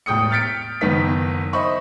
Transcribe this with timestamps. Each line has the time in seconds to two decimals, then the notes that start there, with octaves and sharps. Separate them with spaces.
0.06 E1 A2 G5 D#6 C#7
0.31 F6 G6 A6 B6 C#7 D7
0.81 F#1 D#3 B3 B6
1.53 C5 D#5 E5 B5 C#6